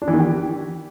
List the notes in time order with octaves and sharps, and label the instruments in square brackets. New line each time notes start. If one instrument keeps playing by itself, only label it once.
[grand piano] D4
E3
D#3
G4